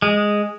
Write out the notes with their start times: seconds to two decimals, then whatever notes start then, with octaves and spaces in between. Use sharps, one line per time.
0.02 G#3